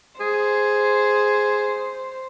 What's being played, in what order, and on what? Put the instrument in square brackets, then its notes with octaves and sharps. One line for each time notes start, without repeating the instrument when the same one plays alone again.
[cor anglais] G#4 [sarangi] C5